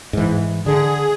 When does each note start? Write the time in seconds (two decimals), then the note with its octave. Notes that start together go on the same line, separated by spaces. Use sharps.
0.13 G#2 E3
0.66 D3 G#4